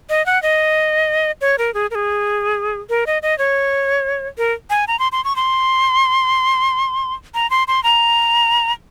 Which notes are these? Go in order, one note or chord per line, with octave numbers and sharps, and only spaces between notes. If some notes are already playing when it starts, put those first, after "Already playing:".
D#5
F#5
D#5
C#5
A#4
G#4
A#4
G#4
A#4
D#5
D#5
C#5
A#4
G#5
A#5
C6
C6
C#6
C6
A#5
C6
C6
A#5